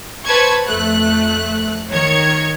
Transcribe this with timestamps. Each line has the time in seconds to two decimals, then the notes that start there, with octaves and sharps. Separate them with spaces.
0.25 B4 C5 A5 C#6 G#6
0.67 F2 A3 F#6
1.91 D#3 C#5 G#6 C#7